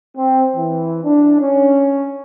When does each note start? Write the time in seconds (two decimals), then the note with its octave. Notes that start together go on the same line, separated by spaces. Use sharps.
0.17 C4
0.56 E3
1.05 D4
1.40 C#4